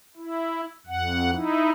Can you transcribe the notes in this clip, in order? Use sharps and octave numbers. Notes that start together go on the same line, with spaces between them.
E4
F2 F#5
D#4 E4